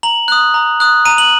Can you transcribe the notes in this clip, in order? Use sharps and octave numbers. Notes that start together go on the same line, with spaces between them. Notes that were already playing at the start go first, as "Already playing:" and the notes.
A#5 F#7
D#6 F#6
A#5
D#6 F#6
A#5 D#7
F#7